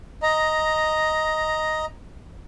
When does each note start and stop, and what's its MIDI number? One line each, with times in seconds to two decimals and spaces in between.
0.23 1.85 75
0.23 1.85 82